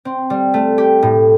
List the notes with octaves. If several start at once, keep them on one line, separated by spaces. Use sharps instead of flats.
C4
G3
A3
G4
A2